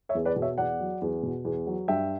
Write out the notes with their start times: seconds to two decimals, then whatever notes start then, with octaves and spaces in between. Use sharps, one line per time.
0.09 C#5 E5
0.15 E2
0.25 B4 D5
0.36 B2
0.42 C#5 E5
0.58 E2 D5 F#5
0.80 F#3
1.02 E2
1.23 B2
1.45 E2
1.67 F#3
1.88 G2 E5 G5